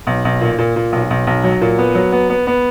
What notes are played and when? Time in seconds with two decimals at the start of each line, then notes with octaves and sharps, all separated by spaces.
0.07 B1
0.25 B1
0.41 A#2
0.59 A#2
0.76 A#2
0.92 B1
1.10 B1
1.27 B1
1.44 F#3
1.61 A#2
1.78 B3
1.95 F#3
2.12 B3
2.30 B3
2.47 B3